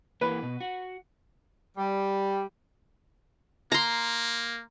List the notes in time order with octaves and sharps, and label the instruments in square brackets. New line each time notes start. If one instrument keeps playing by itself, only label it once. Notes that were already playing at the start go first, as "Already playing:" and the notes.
[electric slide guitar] E3 A#3 [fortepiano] B4
[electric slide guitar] B2
F#4
[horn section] G3
[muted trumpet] A#3 [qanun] A#5 C6